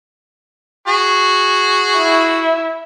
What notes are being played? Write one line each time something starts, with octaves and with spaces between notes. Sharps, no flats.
F#4 G#4
E4